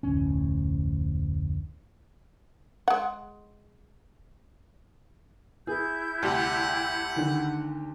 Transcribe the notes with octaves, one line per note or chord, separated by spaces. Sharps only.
F1 D2 A2 C#4
G#3 F#5
E4 G#4 G6
D2 C3 G3 F#5
D3 D#3